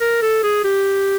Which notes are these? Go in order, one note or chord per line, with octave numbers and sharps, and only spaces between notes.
A#4
A4
G#4
G4